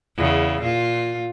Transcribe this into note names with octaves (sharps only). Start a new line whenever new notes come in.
E2 C#3
A#2 F4